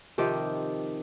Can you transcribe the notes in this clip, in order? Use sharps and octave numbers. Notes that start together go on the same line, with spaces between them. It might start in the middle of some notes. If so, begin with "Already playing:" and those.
C3 D#3 F3 G4